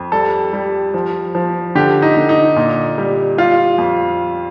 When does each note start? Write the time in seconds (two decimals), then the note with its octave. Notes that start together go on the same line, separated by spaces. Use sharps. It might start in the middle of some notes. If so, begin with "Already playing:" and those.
Already playing: F2
0.12 G3 A4
0.53 G3
0.94 F3
1.35 F3
1.75 D3 G4
2.02 D#4
2.17 D3
2.29 D#4
2.56 A#2
2.98 G3
3.38 G3 F4
3.78 F2